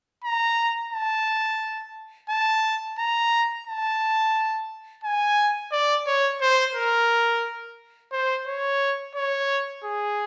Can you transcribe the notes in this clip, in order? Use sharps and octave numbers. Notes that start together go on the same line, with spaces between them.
A#5
A5
A5
A#5
A5
G#5
D5
C#5
C5
A#4
C5
C#5
C#5
G#4